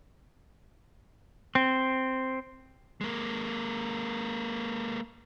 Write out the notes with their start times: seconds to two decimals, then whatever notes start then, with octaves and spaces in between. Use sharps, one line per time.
1.55 C4
3.01 G#3 A#3